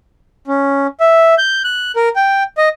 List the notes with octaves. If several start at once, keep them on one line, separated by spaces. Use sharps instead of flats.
C#4
E5
G6
F#6
A#4
G5
D#5